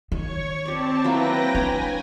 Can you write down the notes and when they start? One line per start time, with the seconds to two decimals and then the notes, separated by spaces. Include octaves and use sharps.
0.12 D#3 C#5 C#6
0.65 C4 G4 D5 A5
1.04 F#3 A#3 E4 B4 G5 A#6
1.55 D4 C#5 G#5